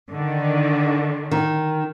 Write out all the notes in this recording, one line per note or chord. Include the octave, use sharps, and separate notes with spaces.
D3 D#3
D#3